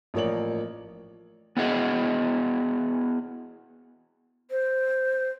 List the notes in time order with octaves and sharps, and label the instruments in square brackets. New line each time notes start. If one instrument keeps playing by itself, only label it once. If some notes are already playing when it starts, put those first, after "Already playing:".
[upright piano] A1 F3 A#3 C#5 D5 F#7
[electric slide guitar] B3 E4 F#4 G#4 D#5
[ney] C5